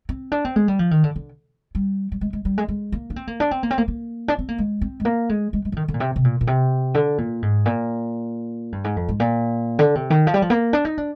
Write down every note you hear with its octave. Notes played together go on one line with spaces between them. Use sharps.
C4
D4
C4
G#3
G3
F3
D#3
D3
D3
G3
G3
G#3
G#3
G3
G#3
G#3
A#3
D4
C4
A#3
D4
C4
A#3
C4
A#3
A#3
D4
C4
A#3
G#3
C4
G#3
A#3
G#3
G#3
G#3
F3
D#3
D3
A#2
C3
C3
A#2
A#2
C3
D3
A#2
G#2
A#2
G2
G#2
F2
G#2
A#2
D3
C3
D#3
F3
G3
F3
A#3
D4
D#4
D4